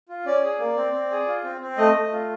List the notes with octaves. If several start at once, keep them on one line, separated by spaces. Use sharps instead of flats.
F4
C#4 D5
G#4
A#3
C4
C4
G#4
F4
C4
C4
A3 D#5
A3
F4